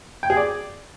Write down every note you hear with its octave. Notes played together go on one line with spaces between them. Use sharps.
G5
G#4
D5